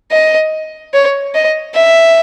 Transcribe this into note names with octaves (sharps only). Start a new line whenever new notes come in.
D#5
C#5
D#5
E5